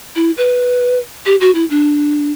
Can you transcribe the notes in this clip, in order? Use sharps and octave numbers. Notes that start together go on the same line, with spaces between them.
E4
B4
G4
F#4
E4
D4